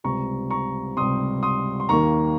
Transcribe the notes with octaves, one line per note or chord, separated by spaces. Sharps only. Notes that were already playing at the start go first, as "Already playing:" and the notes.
C#2 C3 G3 C4 A#5 C#6
A#5 C#6
C#2 C3 G3 C4 C6 D#6
C6 D#6
C6
D#2 D#3 A#3 A#5 C#6